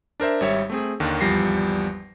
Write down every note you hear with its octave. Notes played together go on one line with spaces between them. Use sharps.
D4 A#4 C5 E5
G#1 G3 C#5 E5
A3 C4 G#4
D#2 D3 D#3
G#1 E2 F3 G3 A#6 C7